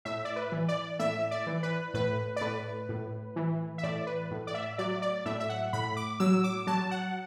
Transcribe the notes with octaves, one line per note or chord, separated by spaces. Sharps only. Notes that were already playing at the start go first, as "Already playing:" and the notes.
A2 E5
D5
B4
E3
D5
A2 E5
D5
E3
B4
A2 B4
D5
A2 B4
A2
E3
E5
A2 D5
B4
A2
D5
E5
F#3 D5
D5
A2 E5
E5
F#5
A2 B5
D6
F#3 E6
D6
F#3 A5
F#5